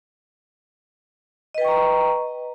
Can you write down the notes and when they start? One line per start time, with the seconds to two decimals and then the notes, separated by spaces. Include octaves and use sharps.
1.54 D#5
1.58 B4
1.61 G5
1.65 C#6
1.68 A#5